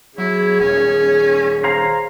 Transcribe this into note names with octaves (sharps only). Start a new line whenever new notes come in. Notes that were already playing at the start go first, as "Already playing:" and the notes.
F#3 E4 G#4 C#5
D#1 C#4
C5 F5 A#5